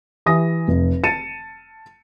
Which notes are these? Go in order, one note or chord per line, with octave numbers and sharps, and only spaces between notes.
E3 G4 E5 G#5 D#6 A#6
F1
A5 A6 C#7 D#7 E7